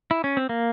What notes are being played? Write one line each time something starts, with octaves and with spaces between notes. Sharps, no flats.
E4
C#4
C4
A#3